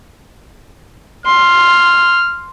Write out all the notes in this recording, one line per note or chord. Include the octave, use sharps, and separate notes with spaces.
C6 F6